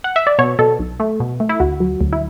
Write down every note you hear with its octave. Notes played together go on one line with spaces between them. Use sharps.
F#5
E5
D5
B2 C#5
B2 A4
B1
A3
B2
A3
E4
D2 F#4
F#3
D2
E4